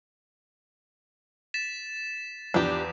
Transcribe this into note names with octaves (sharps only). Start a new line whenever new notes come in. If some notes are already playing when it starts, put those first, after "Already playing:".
A6 B6 E7
E2 F3 D4 G4 B4